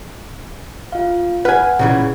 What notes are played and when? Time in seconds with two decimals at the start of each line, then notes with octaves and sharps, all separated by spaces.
0.92 F4 F5
1.45 B4 F#5 G#5 F6
1.79 A#2 C#3 E3